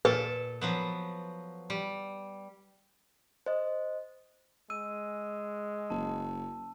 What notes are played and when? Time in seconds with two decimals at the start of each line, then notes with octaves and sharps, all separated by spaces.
0.05 A#2 A4 B4 A5
0.61 F3 F#3 B3
1.70 G3
3.46 C5 D#5
4.70 G#3 E6 D#7
5.90 F#1 A5